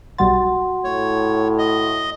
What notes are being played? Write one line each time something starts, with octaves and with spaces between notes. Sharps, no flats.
B1 G3 F#4 F#5 C6 A6
A2 C#5
D#5